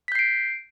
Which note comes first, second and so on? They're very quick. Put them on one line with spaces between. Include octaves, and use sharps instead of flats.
B6 G6 C7 D7